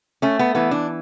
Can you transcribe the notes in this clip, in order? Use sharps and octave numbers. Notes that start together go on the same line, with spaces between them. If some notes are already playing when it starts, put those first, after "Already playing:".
A3 C#4
B3
E3 B3
D4